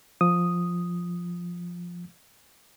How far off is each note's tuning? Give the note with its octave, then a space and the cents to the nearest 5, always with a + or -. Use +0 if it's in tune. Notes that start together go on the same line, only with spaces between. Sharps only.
F3 +0 D#6 +0